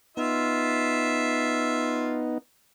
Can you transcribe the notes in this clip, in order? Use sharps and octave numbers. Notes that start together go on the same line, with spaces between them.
B3 D#4 F4 E5